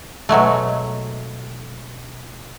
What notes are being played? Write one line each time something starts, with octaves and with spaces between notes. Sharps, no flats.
B2 F#3 G#3 A3